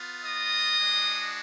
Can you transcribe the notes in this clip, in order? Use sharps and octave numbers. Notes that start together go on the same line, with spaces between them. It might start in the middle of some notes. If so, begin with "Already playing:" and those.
Already playing: B3 F4
D#5 D#6
G#3 D4 F#4